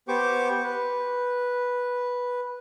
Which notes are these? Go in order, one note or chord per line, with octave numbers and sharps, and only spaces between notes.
B3 G4 C5 G5 C#6 D6
B4